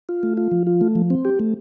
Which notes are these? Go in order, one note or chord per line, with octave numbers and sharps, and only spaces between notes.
F4
A3
F4
F3
F4
A3
F3
C4
G4
A3